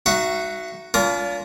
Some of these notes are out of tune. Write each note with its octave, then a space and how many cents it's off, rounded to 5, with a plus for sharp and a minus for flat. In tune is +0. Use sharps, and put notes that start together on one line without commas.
D#4 +0 F#4 +0 E5 +35
D4 -45 F4 +0 A#4 +0